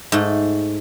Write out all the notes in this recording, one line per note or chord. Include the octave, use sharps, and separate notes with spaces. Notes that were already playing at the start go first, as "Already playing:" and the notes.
G#2 A3